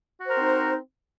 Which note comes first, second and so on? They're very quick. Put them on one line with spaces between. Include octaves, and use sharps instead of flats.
F#4 C5 A#4 C4 D#4